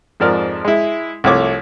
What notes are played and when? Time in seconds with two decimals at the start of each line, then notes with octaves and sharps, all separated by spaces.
0.20 F2 G#2 F3 A#4 D5 F6
0.65 G#3 E4
1.24 C2 F3 A3 C#5 D6